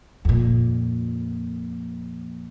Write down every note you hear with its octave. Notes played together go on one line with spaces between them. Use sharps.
F2 A#2